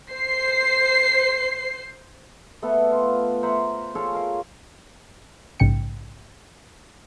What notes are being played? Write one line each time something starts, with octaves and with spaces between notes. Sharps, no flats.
C5 C7
A3 B3 A4
F4
C5 E5 F#5 A#5
F4 G#4 A4 C#5
A#4 F5
A#1 G#2 C#3 G5 C#7